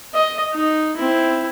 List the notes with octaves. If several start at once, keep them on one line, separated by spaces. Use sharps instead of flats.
D#5
D#4
C4 E4